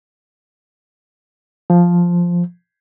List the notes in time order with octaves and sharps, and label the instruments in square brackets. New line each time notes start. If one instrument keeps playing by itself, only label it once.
[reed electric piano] F3